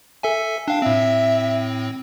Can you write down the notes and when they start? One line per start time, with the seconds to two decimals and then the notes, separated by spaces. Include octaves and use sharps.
0.23 A4 E5 G#5
0.68 D4 F5 G5
0.82 A2 C4 E5